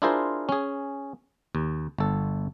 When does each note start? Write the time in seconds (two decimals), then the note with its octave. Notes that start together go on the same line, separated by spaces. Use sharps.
0.02 D4 E4 F4 G#4 A#4 C5
0.49 C#4 G#4
1.55 D#2
1.99 G1 A4